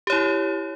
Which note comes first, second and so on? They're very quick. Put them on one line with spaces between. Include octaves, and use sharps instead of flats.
G4 C#5 E4